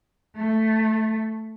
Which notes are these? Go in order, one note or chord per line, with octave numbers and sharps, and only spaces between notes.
A3